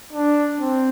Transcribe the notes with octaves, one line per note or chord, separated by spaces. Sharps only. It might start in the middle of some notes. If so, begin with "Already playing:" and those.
D4
C4